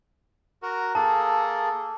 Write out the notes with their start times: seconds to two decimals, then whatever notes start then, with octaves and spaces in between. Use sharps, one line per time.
0.63 F#4 A#4
0.95 A#3 G#4 A4 A5